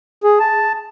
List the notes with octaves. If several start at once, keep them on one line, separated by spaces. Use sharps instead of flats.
G#4
A5